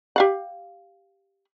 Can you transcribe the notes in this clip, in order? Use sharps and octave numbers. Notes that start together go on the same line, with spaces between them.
G4 F5 F#5